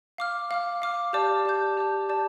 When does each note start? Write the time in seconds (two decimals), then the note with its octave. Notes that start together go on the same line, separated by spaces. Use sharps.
0.18 F5 D6 F6
0.51 F5 D6 F6
0.82 F5 D6 F6
1.13 G4 D5 A5 D6 G6
1.45 G4 D5 A5 D6 G6
1.77 G4 D5 A5 D6 G6
2.09 G4 D5 A5 D6 G6